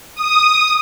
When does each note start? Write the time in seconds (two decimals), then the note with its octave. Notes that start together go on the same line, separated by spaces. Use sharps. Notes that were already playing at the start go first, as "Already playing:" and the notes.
0.15 D#6